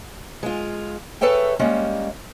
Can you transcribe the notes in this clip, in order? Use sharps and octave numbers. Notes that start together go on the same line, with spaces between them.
G#3 F4
G#4 A4 B4 C#5 E5 G5
G3 G#3 A#3 C#4